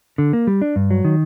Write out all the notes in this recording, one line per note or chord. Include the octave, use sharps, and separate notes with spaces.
D3
A#3
G3
D4
G2
F#3
D#3